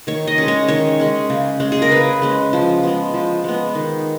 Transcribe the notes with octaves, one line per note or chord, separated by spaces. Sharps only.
D#3 C#5
D#5
G#3 C#4
C#5
D#3 C#5
G#3 C#4
C#3
G#3 C#4
G#4
A#4
C#3 B4
G#3 C#4
F3
G#3 B3
F3
G#3 B3
D#3